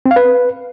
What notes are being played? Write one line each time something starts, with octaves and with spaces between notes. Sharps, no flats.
C4
F5
B4